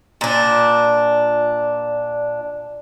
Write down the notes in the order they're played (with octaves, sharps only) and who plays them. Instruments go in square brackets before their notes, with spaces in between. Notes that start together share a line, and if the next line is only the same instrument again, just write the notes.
[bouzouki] A#2 D4